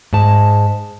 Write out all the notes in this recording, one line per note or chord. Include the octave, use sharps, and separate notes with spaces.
G#2 A5